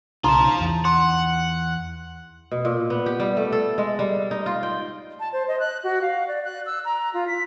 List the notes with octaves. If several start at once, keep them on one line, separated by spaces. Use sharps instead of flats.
B1 C#3 D#4 F4 A5 A#5 C6
E2
F#5 C6
B2
A#2
B3
G4
G3
A3
A4
G#3
G3
D#4
F4
G5
A5
C5
D#5
F#6
F#4
F5
D5
F#6
E6
A#5
F4
B6